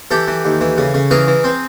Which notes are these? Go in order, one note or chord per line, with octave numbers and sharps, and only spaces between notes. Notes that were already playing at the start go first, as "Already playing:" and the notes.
E3 G4 A4
E3
D#2
E3
C#3
C#3
E3 G#4 A#4
E3
C4